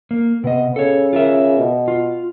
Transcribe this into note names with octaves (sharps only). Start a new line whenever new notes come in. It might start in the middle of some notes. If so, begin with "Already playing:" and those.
A#3
C3 B3 D#5
C#3 A4 C#5
F4 A#4 E5
B2
F4